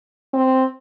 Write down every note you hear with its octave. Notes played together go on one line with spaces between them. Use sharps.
C4